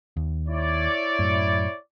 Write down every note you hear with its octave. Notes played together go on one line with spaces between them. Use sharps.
D#2
E4 C#5 D5
F#2 A2